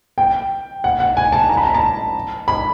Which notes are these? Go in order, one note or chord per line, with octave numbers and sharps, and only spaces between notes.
G5
F#5
F#5
G#5
A5
A#5
B5
A#5
A5
B5